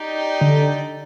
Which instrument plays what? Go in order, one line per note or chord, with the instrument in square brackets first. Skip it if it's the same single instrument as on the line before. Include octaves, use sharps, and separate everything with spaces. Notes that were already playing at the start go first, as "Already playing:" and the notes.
Already playing: [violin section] D#4 G4 D5
[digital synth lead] D3